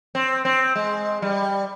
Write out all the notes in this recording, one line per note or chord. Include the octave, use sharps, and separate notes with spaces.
C4
C4
G#3
G3